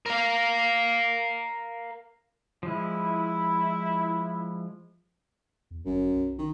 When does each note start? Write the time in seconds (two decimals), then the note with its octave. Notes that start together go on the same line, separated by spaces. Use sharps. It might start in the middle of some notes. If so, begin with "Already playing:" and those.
0.06 A#4 F5
2.63 F3 G#3 E4
5.71 E2
5.85 G1 F#2
6.12 B1
6.39 D#3